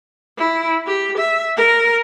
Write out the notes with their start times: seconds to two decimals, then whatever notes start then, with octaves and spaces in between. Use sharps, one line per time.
0.38 E4
0.87 G4
1.17 E5
1.57 A#4